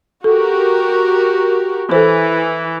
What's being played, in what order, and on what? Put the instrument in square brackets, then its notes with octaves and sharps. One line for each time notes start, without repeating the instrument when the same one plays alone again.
[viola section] F#4 G4 A#4 [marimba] A4
[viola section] E3 [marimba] A4 C5